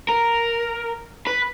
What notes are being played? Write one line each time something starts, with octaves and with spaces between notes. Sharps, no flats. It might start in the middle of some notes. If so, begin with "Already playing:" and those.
A#4
B4